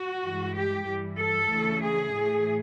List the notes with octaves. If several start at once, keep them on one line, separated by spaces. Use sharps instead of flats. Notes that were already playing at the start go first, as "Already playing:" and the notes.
Already playing: F#4
G2 E3 G#3
G4
G2 E3 G3
A4
D2 C#3 E3 A3
G#4
A2 E3 A3